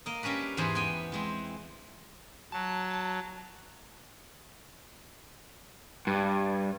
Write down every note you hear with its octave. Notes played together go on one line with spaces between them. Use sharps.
A#3 A#4 D#5
G3 C#4 D4 B4
E2 G#2 E3 G#4 C5 B5
B3 G5 G#5
E3 G#3 C4
F#3 A5
G2